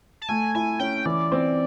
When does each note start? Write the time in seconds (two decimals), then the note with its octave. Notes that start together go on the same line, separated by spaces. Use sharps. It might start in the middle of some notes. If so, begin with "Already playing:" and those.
0.22 A5
0.29 A3 G#5
0.55 E4 G#5
0.79 C#4 G5
1.06 E3 D5
1.32 C4